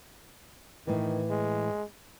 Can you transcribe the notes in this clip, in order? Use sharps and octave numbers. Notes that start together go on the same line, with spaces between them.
A2 D#3 E3
G#3